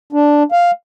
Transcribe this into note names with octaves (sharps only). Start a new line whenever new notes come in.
D4
F5